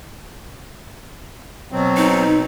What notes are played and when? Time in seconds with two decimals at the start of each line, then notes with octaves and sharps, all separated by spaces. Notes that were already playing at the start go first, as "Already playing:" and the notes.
1.72 B2 F#3 C4
1.97 D#4